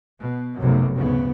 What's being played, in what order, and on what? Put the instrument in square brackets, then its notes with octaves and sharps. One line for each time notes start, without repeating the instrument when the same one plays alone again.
[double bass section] B2
F1 B1 F#2 C3
D2 G#2 C#3 B3